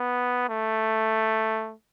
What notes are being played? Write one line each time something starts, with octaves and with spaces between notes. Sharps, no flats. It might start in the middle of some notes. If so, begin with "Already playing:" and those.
Already playing: B3
A3